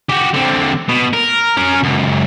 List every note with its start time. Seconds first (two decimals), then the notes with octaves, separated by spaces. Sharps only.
0.09 F#4 G4
0.34 D3 C4
0.88 B2
1.13 A#4
1.57 C#4 A#4
1.83 C#2 F#2